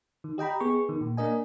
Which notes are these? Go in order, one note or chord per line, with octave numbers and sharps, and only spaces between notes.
D#3
G4 D#5 G5 A#5 B5
B3 G#4 C#6
D#3
A#2
A#3 D4 A#4 D#5 G#5